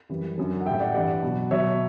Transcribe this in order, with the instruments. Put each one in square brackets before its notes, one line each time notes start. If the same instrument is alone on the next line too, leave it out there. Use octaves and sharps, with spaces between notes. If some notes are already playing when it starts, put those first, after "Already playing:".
[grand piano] F#2 E3 G3
F#2 D3 F#3
F#5
A2 G3 E5 G5
D5 F#5
G2 E3 G3 D5 F#5
B2 F#3
B2 F#3 C#5 E5